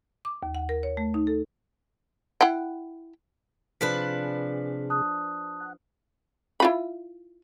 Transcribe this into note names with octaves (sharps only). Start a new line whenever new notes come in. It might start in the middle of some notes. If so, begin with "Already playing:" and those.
D6
D#2
F#5
A#4
C#5
A3
D#4
A4
E4 F#5 G5
C3 F3 D4 G#4 B4 B6
A5 D#6 F#6
F#5
E4 F4 B5